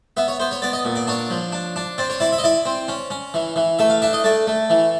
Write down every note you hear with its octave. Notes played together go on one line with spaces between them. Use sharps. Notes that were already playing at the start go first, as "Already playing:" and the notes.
B3 E5
C#5
B3 C5
C#5
B3 D5
D#5
A#2
D5
D4 C#5
F3
D4
D4
C4 D5
C#5
E4 D5
E5
D#5
E4 D5
C4
C#4
C#4
E3
E3
A3 E5
F5
D4 E5
D#5
A3 D5
A3
E3